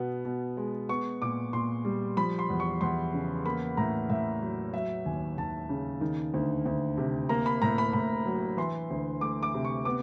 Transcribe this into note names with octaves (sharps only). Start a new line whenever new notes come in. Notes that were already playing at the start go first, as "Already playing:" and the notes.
Already playing: B2 B3
B2
G#3
B3 C#6
A#2 D6
A#2 C6
G3
F3 B5
C6
E2
C#6
E2 C6
C#3
A#3 B5
A2 A#5
A2 E5
F#3
F#3 E5
D#2 G#5
D#2 A5
C#3
D#3
D2
D2
C3
A#3 A#5
B5
A2 A#5
B5
A2 B5
F#3
E3 C6
D2
A3 D6
D6
C3
C#6
B3 D6